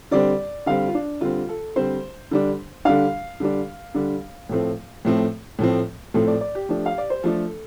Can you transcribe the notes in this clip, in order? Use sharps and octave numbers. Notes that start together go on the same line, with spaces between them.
D3 G3 C4 D5
D3 G3 C4 F5
F4
D4
D3 G3 C4 F4
A4
D3 G3 C4 C5
D3 G3 D4
D3 G3 D4 F5
D3 G3 D4
D3 G3 D4
A2 F3 A3 C4
A2 F3 A3 C4
A2 F3 A3 C4
A2 F3 A3 C4 A4
D5
D5
G4
F3 A3 D4
F5
D5
C5
F3 A3 D4 A4